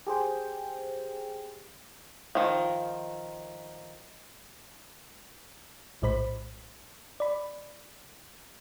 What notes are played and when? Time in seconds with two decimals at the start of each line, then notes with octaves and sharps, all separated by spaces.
0.07 G4 G#4 C5 G5
2.35 D#3 F3
6.02 A#1 A2 G#3 C5 B5 B6
7.20 D5 B5